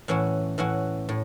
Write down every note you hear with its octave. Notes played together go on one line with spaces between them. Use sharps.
A2 E3 C#4 F#4
A2 E3 C#4 F#4
A2